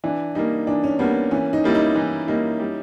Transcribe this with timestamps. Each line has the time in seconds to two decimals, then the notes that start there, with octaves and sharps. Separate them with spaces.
0.04 E3 D4
0.35 G3 A#3 D#4
0.67 E3 D4
0.84 C#4
0.99 G3 A#3 B3
1.31 E3 C#4
1.53 D#4
1.64 G3 A#3 E4
1.75 D#4
1.96 E3 D#4
2.28 G3 A#3 D#4
2.59 G3